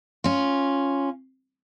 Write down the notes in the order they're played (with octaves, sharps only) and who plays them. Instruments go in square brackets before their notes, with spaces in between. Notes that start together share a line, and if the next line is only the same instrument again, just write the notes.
[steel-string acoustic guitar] C#4 F4